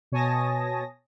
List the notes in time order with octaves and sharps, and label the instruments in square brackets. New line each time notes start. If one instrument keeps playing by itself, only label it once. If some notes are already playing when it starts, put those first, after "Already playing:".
[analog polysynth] B2 C#5 G#5 A5 D#6 A#6